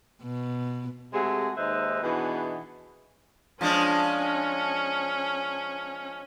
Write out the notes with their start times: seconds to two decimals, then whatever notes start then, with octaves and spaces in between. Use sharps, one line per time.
0.23 B2
1.13 C3 G#3 A3 C4 F#4 G#4
1.57 D#2 G#3 D#4 B4 C5 E5
2.03 B2 E3 B3 D4 D#4 G#4
3.61 F3 G#3 C#4 D4